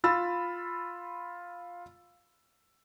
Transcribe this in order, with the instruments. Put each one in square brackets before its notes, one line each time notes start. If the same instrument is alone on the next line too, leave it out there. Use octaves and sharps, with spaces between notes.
[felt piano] F4 B5 E6 A6